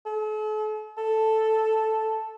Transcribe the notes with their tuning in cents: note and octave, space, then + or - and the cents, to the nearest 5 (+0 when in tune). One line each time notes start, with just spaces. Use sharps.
A4 -45
A4 +0